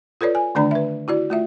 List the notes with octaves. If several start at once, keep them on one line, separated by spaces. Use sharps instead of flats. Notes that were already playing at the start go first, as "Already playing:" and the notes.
F4 A4 B4 C#5 D5
G#5
D3 D#3 A3 D4 D5 A#5
B4 E5
E4 F#4 D5
A3 F4 E5